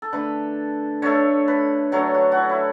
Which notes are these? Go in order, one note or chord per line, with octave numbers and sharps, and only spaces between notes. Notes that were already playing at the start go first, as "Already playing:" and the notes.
A4
D3 A3 B4
D3 A3 C#5
B4
D3 F#3 A3 C#5
F#4
F#4
E4
E4